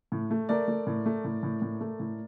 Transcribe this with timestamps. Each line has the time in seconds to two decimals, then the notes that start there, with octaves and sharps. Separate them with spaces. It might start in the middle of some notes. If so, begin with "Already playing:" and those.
0.12 A2
0.31 A3
0.49 A3 A#4 D5
0.68 A3
0.87 A2
1.06 A3
1.24 A2
1.43 A2
1.62 A2
1.81 A3
2.00 A2